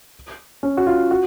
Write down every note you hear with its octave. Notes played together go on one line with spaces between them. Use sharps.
C#4
F#4
F4
F#4